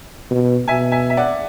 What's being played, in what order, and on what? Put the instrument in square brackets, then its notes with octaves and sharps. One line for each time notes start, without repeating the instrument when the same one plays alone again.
[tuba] B2
[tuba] B2 [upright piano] E5 G#5
[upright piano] E5 G#5
E5
D5 F#5